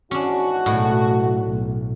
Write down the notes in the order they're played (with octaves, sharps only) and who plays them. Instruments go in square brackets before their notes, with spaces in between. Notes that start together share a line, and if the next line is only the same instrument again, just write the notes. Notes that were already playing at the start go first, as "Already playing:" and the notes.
[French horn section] E2 G#2 F#4 [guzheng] C#4 D4
[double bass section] B1 A3 [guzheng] A2
[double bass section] B1